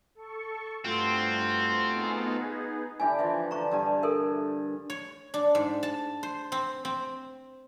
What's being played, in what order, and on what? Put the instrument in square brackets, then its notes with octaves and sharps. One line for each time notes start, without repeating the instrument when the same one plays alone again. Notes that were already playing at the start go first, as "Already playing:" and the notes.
[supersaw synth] A4 C#6
[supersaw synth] G2 [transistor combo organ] A3 F4 F#4 [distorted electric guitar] C4
[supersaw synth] B3 D#4 G#4
[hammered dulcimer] D3 E4 G4 [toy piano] G#5
[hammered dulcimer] E3 F3
[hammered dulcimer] D3 [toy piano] A#5 C#6
[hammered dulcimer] G2 G3 G#5
[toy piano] A4 A#4 E5
[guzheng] C#5
D4
G#2
A5
C5
C4
C4